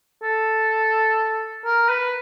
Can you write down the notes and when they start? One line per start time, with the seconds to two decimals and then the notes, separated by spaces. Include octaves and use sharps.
0.23 A4
1.65 A#4
1.89 B4